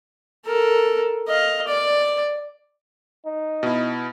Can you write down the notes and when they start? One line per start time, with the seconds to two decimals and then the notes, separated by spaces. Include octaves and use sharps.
0.46 A4 A#4
1.28 D#5 F5
1.67 D5
3.26 D#4
3.63 B2 E4